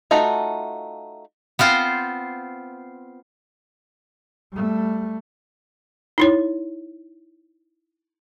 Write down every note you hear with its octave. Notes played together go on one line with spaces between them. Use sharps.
A3 D#4 F4 F#4
B3 C4 F4 C5
G3 A3
D#4 E4 C#5